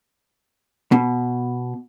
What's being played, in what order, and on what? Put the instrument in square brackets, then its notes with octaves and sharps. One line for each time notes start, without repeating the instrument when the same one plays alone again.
[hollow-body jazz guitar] B2